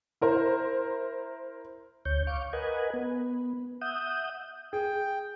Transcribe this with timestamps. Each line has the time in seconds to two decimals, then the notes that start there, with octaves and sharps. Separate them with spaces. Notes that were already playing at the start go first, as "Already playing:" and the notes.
0.21 E4 A#4 C5
2.05 D2 C#5 G6
2.27 F5 C#6 D6
2.53 A#4 B4 D#5 F#5 G#5
2.94 B3
3.81 E5 F#5 D#6 G6
4.73 G#4 G5